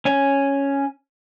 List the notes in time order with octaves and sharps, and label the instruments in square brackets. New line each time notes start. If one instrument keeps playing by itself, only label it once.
[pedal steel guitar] C#4 G#5